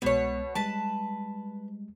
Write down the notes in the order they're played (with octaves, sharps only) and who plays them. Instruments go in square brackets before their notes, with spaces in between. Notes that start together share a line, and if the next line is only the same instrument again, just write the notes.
[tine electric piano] C2 G#3 B3 [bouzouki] B2 C#5
[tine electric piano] G3 G#3 [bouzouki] B4 A5